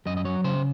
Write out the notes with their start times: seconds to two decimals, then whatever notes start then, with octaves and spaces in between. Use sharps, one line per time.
0.06 F#2 D#5
0.17 D#5
0.25 F#3 C#5
0.44 C#3 C5